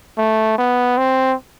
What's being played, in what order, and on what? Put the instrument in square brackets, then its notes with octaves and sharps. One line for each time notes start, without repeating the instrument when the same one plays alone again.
[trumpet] A3
B3
C4